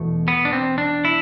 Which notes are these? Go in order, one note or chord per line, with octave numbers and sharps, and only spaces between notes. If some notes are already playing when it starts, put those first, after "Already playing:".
Already playing: E2 B2 A3
B3
D4
C4
D4
E4